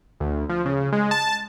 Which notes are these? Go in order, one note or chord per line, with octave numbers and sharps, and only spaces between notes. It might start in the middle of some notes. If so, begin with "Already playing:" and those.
D2
F3
C#3
G#3
A5